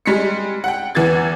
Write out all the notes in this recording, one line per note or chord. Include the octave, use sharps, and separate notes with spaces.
G3 G#3 B6 C#7
F#5 G5
E2 E3 B3 G#6 A6